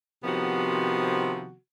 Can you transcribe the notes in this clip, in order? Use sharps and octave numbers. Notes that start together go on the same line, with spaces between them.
C3 D#3 F3 B3 F#4